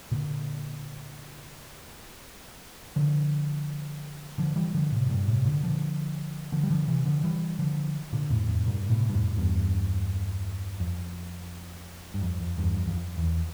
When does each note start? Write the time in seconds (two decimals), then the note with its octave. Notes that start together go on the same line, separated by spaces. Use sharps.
0.11 A#2 D3
2.96 D3 F3
4.38 D3 F3
4.56 E3 G3
4.75 D3 F3
4.92 A2 C3
5.06 A2
5.09 G2 A#2
5.28 A2 C3
5.45 A#2 D3
5.63 D3 F3
6.52 D3 F3
6.63 G3
6.70 D3 F3
6.88 C3 E3
7.05 D3 F3
7.24 E3 G3
7.59 D3 F3
8.13 A#2 D3
8.30 F2 A2
8.48 F2 A2
8.67 G2 A#2
8.90 A2 C3
9.09 G2
9.14 F2 A2
9.37 E2 G2
10.80 F2
12.14 G2
12.22 F2
12.41 F2
12.58 E2 G2
12.76 F2
12.87 E2
12.93 F2
13.18 E2